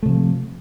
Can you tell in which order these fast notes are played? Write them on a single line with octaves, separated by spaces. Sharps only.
A3 C3 F3